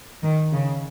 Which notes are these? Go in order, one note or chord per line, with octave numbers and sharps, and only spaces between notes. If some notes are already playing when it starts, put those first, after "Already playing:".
D#3
C#3